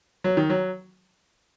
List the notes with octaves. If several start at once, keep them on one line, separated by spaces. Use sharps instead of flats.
F#3
D#3
F#3